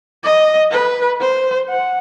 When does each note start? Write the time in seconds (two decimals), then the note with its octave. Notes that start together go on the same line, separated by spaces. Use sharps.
0.24 D#5
0.71 B4
1.21 C5
1.69 F#5